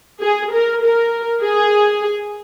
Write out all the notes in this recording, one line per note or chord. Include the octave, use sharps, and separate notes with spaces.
G#4
A#4
A#4
G#4